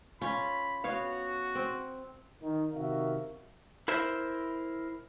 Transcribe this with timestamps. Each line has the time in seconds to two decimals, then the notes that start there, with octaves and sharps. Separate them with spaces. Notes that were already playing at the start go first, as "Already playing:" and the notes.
0.21 C#4 F4 B5
0.84 B3 F#4 C#5 F5
1.55 C4
2.42 D#3
2.73 C3 D#3 F#4 A#4 E5 F5
3.88 E4 A#4 C5 E5